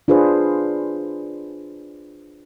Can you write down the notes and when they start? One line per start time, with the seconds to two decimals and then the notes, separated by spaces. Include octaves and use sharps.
0.08 D4 F4 G#4 B4 C5